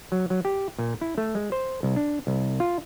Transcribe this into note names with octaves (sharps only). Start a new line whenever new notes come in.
F#3
F#3
G4
A#2
E4
A3
G#3
C5
C2
D4
C2
F4